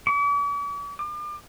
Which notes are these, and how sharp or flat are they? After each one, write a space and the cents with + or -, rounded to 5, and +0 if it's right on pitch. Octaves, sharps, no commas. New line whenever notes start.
D6 -45
D6 +40